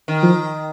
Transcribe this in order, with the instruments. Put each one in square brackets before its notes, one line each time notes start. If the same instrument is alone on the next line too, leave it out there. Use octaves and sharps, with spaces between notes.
[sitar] D#3
[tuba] F3